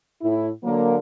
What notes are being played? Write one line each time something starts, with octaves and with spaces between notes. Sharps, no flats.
A2 E4
D3 F#3 A#3